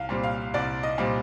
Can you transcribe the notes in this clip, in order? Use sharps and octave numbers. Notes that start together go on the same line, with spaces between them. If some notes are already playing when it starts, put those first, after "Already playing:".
Already playing: C2 F5
A#2 G3 C4
F5
C2 D5
D#5
A#2 G3 C4